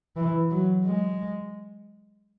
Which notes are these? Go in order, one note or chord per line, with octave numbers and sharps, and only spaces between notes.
E3
F#3
G#3